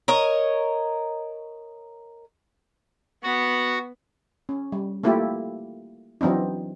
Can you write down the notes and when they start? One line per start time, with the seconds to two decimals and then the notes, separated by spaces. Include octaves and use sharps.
0.08 A#4 C#5 D#5
3.23 B3 F#4 F#5
4.49 C#4
4.72 G3
5.03 A3 A#3 E4 F4 G4 A4
6.21 E3 F#3 C4 D4 D#4